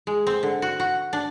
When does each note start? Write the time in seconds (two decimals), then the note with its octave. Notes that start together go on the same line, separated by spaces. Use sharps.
0.07 G#3
0.27 C4
0.43 D3
0.62 F#4
0.80 F#4
1.13 D4